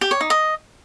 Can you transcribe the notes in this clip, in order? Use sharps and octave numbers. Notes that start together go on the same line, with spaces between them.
G4
C#5
D#4
D#5